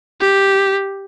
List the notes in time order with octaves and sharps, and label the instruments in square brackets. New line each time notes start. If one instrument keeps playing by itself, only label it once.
[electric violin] G4